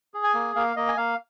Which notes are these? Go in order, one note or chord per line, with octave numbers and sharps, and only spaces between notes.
G#4
G#5
A#3
A#3 F5
A#3 D#5
G#5
A#3 F5